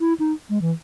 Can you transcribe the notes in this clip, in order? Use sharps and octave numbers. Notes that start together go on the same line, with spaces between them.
E4
D#4
G#3
E3